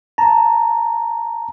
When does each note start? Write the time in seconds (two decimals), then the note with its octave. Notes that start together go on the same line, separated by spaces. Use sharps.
0.18 A5 A#5